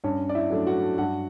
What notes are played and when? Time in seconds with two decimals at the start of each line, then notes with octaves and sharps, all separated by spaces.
0.04 G2 C#4 C#5
0.29 D5
0.35 E4 E5
0.50 F#3 A3 D4
0.67 F#4 F#5
0.98 G2 F#4 F#5